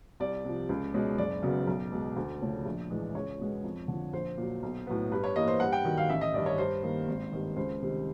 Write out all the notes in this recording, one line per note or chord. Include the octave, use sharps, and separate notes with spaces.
C2 D5
C3 F3
C#2
B2 G#3 C#4
F#1 D5
F#2 C#3 F#3 B3
B1
B2 G#3
D2
C#3 F3 A3 C#4
A#1
A2 E3 G#3
C#2 C#5
B2 G#3 B3
F2
D3 F3
A#1 C5
A#2 F#3
B1
A2 F#3 B3
G2 B4
C#5
E3 G3 A#3 D#5
C5
G2 F#5
G5
D#3 F#3
F5
A1 E5
D#5
G2 D#3 D5
C#5
G2 C5
D#3 G3 A#3
G#1
G2 D#3
C#2 C5
C3 D#3 G3 C4